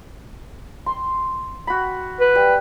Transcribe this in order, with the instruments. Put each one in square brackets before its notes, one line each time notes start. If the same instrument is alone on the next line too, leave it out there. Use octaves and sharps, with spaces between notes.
[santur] C6
F#4 B5
[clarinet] B4
[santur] G3